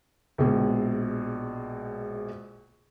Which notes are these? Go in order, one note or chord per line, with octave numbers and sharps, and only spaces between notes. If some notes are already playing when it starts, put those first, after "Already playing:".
A#1 B2 G#3